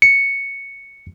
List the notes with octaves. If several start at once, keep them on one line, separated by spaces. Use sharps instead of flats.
C#7